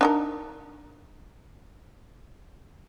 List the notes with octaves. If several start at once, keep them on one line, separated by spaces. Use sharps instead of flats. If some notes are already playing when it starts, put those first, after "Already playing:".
D4 D#4 A#4